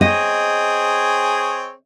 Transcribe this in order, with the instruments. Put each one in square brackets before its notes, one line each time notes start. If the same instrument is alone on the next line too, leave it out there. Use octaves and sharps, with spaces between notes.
[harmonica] C4 G#4 C#5 [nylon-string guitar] D#5